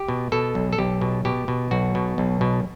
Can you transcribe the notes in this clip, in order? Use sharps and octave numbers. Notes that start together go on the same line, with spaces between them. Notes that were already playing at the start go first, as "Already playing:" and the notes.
Already playing: G4
B2
B2 A4
B1
A4
B1 G4
B2
B2 G4
B2
B1 F#4
B2
B1
B2